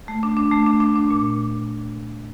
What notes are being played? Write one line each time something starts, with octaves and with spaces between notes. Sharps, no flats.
A3
D4
D4
A3
D4
D4
D4
A#2